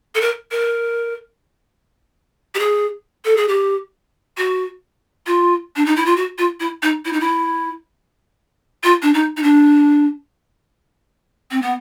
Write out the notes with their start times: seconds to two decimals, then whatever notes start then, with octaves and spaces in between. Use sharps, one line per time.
0.15 A4
0.21 A#4
0.51 A#4
2.55 G4
2.59 G#4
3.25 A4
3.37 G#4
3.48 G4
4.37 F#4
5.27 F4
5.76 D4
5.86 D#4
5.96 E4
6.06 F4
6.16 F#4
6.38 F4
6.60 E4
6.83 D#4
7.05 E4
7.13 D#4
7.20 E4
8.84 F4
9.02 D4
9.14 D#4
9.37 D#4
9.43 D4
11.51 C4
11.62 B3